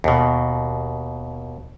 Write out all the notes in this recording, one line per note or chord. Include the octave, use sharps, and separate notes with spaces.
D#2 B2